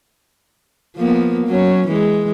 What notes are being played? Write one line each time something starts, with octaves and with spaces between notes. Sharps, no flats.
F3 A#3 B3
F#3 C#4
E3 G#3